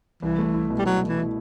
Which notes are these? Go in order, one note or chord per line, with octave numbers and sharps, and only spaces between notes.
C2 E3
A3
E4
B2
G3
C2 F#3
A3
E3
E4